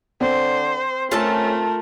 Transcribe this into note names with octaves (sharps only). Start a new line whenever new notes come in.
D3 C4 C5
A3 C#4 F4 A4 A#4 A5